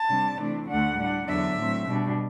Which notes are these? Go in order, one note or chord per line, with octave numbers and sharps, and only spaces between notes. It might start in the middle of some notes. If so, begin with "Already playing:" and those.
Already playing: A5
C3 G3 D4
C3 E3 A3 D4
D2 D3 A3 D4 F#5
A2 G3 D4
E2 D3 F#3 B3 D4 E5
A2 F#3 C4
B2 G3 D4